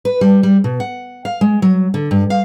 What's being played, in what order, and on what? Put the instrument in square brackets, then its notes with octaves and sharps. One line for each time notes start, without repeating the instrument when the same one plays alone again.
[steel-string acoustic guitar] B4
G3
G3
B2
F#5
F5
G#3
F#3
D3
G2
F5